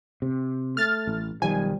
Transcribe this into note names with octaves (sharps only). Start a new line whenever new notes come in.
C3
A3 F6 A6
A1
B1 D#3 F3 G3 G#5